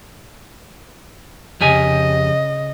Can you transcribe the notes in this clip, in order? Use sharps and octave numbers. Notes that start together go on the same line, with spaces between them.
F2 C#3 G4 D#5 G#5